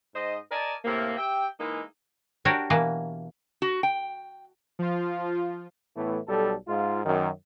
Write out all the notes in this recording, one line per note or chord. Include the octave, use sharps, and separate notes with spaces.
G#2 C5 D#5
A#4 D5 D#5 G#5 A5
A2 C3 A#3
G4 E5 G5
E3 G#3 A#3 D#4 E4
D4 F#4 G4 A#4 C#5
B2 E3 A#3
F#4
G5
F3 F4
A2 E3 A3 B3
B1 G3 A4
G#2 G#3 F4
F#2 D#3